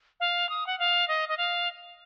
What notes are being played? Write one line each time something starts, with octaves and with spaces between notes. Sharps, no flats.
F5
D#6
F#5
F5
D#5
D#5
F5